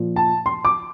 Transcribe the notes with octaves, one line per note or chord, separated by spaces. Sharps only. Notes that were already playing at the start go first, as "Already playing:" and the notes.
Already playing: A#2 F3
A5
C6
D6